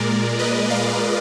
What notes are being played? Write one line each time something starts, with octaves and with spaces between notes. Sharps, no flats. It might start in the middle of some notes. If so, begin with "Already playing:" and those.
Already playing: A#2 G#3 A#4 D5
B4 D#5
D5 F5